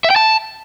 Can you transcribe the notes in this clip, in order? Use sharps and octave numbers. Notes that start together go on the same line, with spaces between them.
E5
G5
A5